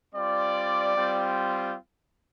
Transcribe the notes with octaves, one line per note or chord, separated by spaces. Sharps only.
G3 C4 F4 D5
G3 C4 F4